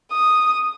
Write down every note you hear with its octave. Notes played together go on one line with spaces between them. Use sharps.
D#6